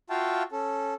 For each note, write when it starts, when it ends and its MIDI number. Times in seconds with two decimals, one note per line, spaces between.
0.10 0.43 65
0.10 0.43 66
0.10 0.43 76
0.10 0.43 77
0.10 0.43 79
0.10 0.43 81
0.52 0.94 61
0.52 0.94 69